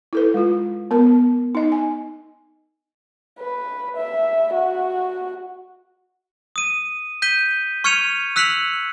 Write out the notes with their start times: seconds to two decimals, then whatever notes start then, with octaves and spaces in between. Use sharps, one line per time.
0.13 E4 A4 B4
0.34 G#3 F4
0.91 B3 A#4
1.55 D#4 D#5
1.72 G#5
3.39 B4
3.97 E5
4.54 F#4
6.56 D#6 D#7
7.22 G6 B6 D#7 G7
7.84 C#6 F6 G#6 C#7 D#7 F7
8.36 E6 F#6 B6 C#7 F7 F#7